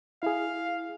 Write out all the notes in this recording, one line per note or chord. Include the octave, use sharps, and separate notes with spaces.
E4 G#4 F5